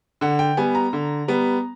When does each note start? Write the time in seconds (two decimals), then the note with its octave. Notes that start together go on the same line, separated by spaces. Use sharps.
0.21 D3 F#5
0.39 G5
0.57 G3 B3 G#5
0.75 A#5
0.93 D3
1.28 G3 B3